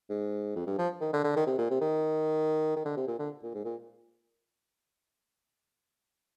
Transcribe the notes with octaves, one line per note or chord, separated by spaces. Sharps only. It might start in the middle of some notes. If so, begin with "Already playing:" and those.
G#2
F2
G2
F3
D#3
D3
D3
D#3
C3
A#2
C3
D#3
D#3
D3
C3
A#2
D3
A#2
G#2
A#2